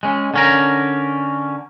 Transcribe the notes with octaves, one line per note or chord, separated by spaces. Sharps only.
G#3 C#4
D3 C#4 A#4